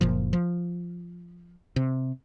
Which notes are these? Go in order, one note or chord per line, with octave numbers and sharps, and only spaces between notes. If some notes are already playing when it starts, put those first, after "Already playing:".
F#1 A#2 F3
F3
C3